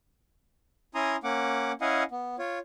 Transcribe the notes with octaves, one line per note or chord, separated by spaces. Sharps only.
C#4 E4 G#5 A#5 C6 D#6
A#3 C#4 F#5 D6
C#4 E4 D#5 F5 F#5 G#5
B3
F4 C#5